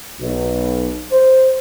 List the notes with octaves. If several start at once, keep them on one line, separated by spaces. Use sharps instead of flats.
B1
C5